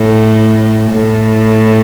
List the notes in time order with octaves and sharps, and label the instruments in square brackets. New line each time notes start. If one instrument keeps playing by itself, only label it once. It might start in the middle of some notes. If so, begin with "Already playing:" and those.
Already playing: [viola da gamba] A2
A2